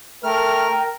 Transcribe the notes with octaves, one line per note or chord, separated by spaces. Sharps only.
A3 A#4 G5 F6